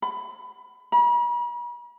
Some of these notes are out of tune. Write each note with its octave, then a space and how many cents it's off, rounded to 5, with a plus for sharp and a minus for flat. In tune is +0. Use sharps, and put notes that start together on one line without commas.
B5 +20
B5 -45